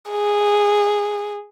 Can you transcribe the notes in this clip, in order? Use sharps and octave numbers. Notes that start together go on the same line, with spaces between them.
G#4